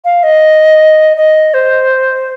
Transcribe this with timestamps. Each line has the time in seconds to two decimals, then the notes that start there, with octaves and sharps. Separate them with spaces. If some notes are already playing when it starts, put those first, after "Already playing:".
0.05 F5
0.23 D#5
1.17 D#5
1.54 C5